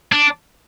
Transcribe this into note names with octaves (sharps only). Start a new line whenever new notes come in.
D4